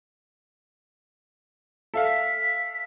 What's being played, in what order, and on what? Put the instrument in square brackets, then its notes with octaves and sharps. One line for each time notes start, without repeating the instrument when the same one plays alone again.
[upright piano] A4 E5 F5 [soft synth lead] B6